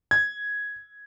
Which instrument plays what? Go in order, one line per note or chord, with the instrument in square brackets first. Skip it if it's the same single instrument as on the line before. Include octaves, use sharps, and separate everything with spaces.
[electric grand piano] G#6